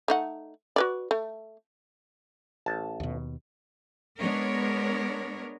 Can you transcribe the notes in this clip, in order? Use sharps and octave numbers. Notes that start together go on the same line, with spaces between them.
A3 D#4 F#5
F#4 B4 D5
A3
A1 A5
D#2 B2
G#3 B3 D4 A#4 C#5